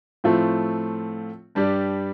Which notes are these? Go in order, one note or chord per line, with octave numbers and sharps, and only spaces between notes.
A2 F3 A3 C4 F4
G2 G3 D4 G4 D5